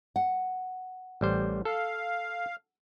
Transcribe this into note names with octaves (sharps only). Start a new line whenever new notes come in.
F#5
A1 G3 C5
A4 F5